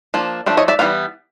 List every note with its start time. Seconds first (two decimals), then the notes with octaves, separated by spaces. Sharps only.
0.14 F3 A#3 D4
0.46 F3 A3 D4
0.57 C#5 D#5
0.68 D5 E5
0.79 E3 G3 B3 F5